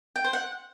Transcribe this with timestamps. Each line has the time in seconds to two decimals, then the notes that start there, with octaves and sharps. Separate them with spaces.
0.16 G5
0.24 C5
0.33 F#5